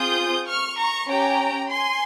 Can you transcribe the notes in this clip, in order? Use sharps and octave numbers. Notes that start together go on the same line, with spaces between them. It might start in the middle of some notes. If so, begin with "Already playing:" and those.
Already playing: C4 F4 G#4 D#6 G6
C#6 F6
A#5 C#6
C#4 G4 G5 A#5
G#5 C6